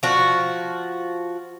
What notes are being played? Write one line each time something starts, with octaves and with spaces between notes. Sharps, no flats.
F3 F#4